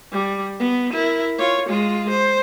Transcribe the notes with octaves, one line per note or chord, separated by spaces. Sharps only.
G3
B3
E4 A#4
F4 C#5
G#3 F4
C5